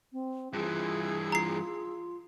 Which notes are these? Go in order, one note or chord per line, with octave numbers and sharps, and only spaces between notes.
C4
G2 E3 F4 G#4 E6
F4 A#5 C7